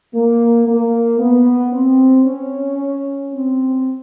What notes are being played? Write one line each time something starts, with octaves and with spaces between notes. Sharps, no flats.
A#3
A#3
B3
C4
C#4
C4